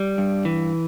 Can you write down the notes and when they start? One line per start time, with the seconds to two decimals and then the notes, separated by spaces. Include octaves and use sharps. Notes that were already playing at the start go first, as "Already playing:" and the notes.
Already playing: G3
0.18 G2
0.45 E3